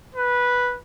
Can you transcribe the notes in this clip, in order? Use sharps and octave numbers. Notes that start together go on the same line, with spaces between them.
B4